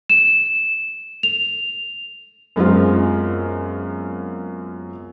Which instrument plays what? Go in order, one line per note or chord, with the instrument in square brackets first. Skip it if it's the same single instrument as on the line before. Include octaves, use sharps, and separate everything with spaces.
[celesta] E7
F7
[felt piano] F#2 G#3 B3 C4 F4